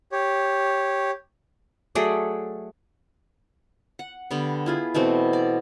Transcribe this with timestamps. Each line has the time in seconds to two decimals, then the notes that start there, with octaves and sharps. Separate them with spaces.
0.12 G4 C#5
1.95 F#3 A3 G#4 D5
3.99 F#5
4.31 D3 G3 B3
4.66 E4 F4 G#4
4.95 B2 E3 A3 C4
5.33 D5